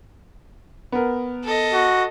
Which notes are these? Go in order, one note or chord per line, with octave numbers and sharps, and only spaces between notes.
B3 A#4
A4 D#5
F#4